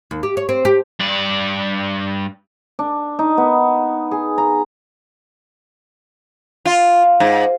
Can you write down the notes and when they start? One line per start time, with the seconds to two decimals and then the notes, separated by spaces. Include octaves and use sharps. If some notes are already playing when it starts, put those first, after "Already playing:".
0.11 D#2
0.23 G4
0.37 C#5
0.49 C4
0.65 G4
1.00 G2 D5
2.79 D4
3.19 D#4
3.38 B3
4.11 G#4
4.38 A#5
6.65 F4
7.20 G#2